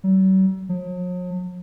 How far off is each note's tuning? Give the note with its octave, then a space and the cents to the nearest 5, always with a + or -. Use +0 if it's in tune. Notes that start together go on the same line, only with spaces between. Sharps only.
F#3 +45
F#3 -45